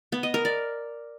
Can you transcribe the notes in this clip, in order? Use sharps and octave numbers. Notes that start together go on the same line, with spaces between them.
B3
D#5
A#4
D5